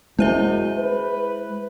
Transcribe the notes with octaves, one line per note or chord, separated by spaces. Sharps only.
F#2 G#3 E4 C5 E5
B4